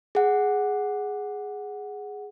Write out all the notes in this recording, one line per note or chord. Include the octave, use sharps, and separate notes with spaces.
G#4 F#5